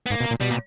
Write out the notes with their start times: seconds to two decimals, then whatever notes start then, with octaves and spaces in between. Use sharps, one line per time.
0.06 B3
0.10 G#2 A#3
0.21 B2
0.31 A#2
0.40 B2 G3
0.51 A#2